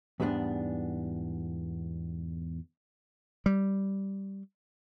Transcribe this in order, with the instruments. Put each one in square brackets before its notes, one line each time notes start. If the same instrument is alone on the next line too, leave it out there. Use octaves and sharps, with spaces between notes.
[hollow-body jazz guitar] E2 G#2 G3 B3 D4
[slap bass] G3